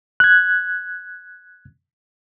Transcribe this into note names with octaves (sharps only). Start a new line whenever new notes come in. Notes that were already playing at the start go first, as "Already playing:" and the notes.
F#6 G#6